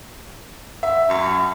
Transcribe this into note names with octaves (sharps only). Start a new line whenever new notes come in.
E5
F#2